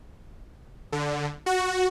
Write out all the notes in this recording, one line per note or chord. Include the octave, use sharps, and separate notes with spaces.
D3
F#4